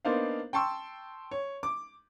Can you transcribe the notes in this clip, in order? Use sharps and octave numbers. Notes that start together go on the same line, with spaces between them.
A#3 B3 D4 D#4 C5 F5
G5 A5 C6 C#6 E6
C#5
D6